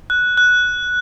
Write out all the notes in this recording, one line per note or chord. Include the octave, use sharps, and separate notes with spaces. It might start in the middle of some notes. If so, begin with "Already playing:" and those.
F#6
F#6